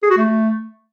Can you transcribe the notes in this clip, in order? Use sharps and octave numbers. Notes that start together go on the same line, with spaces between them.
G#4
F#4
A3